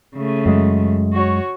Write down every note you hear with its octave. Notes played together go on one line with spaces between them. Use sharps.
C#3 A3
F#2 G#3
F#4 C#5